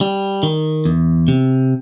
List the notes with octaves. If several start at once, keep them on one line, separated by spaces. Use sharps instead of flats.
G3
D#3
E2
C3